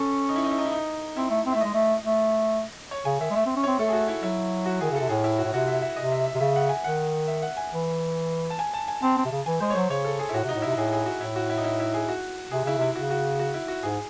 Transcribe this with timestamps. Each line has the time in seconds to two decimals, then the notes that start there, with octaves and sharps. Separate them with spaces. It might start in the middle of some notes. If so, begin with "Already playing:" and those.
Already playing: C#4 A4
0.29 D#4
0.36 E4
0.44 D#4
0.51 E4
0.58 D#4
0.65 E4
0.72 D#4
1.17 C4 E4
1.31 A3
1.46 C4
1.52 A3 E5
1.61 G#3 D#5
1.74 A3
2.04 A3
2.91 C#5
3.05 C#3 G#5
3.20 D#3 E5
3.30 G#3
3.35 A3 E5
3.46 C4
3.56 C#4
3.63 C4 C#5
3.79 A3 A4
3.88 G#4
3.93 F#4
4.08 E4
4.22 F#3 E4
4.66 F#4
4.81 D#3 G#4
4.91 C#3
4.95 A4
5.00 C3
5.09 A2 G#4
5.24 E4
5.38 F#4
5.45 A2
5.53 C3 F#4
5.68 E5
5.82 E5
5.96 C3 D#5
6.12 E5
6.26 E5
6.35 C3
6.40 C#3 E5
6.56 F#5
6.69 G#5
6.84 D#3 F#5
7.28 E5
7.42 F#5
7.57 G#5
7.72 E3
8.50 A5
8.59 G#5
8.74 A5
8.88 G#5
9.02 C4 A5
9.17 C4
9.25 C3
9.31 C#3
9.46 E3 G#5
9.60 G#3 C5
9.70 C#5
9.75 F#3 C5
9.90 C#3 C#5
10.05 A4
10.19 G#4
10.29 E4
10.33 A2 F#4
10.44 C3 D#4
10.55 A2
10.62 C3 E4
10.76 A2 G#4
10.92 G#4
11.06 F#4
11.20 A2 E4
11.36 F#4
11.50 E4
11.58 D#4
11.64 E4
11.80 E4
11.94 G#4
12.08 F#4
12.51 C3 G#4
12.65 C#3 E4
12.78 C3 E4
12.95 C#3 F#4
13.11 F#4
13.40 F#4
13.54 E4
13.68 F#4
13.83 G#2 G#4